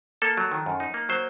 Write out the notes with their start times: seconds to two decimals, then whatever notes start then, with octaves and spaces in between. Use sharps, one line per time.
0.22 A#3 A4
0.37 F#3
0.52 D#3
0.66 F#2
0.80 D#4
0.94 A#3
1.09 F#3 C5